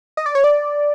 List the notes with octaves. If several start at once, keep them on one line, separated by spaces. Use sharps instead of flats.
D#5
D5
C#5
D5